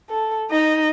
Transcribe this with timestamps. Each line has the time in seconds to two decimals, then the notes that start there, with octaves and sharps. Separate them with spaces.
0.10 A4
0.50 D#4 D#5